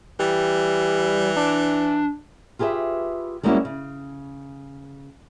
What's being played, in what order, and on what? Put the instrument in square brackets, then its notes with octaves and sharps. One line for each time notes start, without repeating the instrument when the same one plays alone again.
[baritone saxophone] E3 [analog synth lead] G3
[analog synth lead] D4
[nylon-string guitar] F4 G4 G#4 B4 E5
G3 G#3 A#3 C#4 E4 F#4
C#3